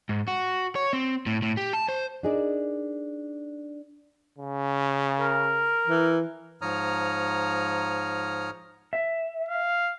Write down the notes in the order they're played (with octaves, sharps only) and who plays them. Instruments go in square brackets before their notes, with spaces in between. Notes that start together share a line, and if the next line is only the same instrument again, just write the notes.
[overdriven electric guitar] G#2
F#4
C#5
C4
A2
A2
G4
A5
C5
[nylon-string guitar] D4 D#4 G#4 A#4 D5
[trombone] C#3
[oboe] A#4
[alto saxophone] E3
[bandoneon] G#2 F3 C#5 A#5 D#6 F6
[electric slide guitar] E5
[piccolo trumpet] F5